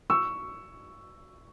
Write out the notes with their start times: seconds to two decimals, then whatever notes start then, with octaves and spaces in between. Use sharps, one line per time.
0.10 C#6 E6